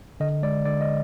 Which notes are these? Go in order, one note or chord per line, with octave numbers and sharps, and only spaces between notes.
D3 D#5
G#3 D5
D3 D5
D#5